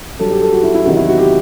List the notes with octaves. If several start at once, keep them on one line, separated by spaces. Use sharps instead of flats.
G2 F#3 A4
G4
A4
F#4
E4
E4
E2 C3 D#3 F#3 F#4
E4
F#4
G4